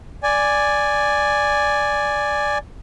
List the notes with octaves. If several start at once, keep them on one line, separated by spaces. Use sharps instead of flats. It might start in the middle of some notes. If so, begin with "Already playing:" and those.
D5 G#5